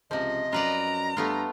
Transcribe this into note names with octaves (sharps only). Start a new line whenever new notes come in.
C#2 C3 F3 D#5
F#2 F4 B4 D5 A#5
G2 A3 B3 F4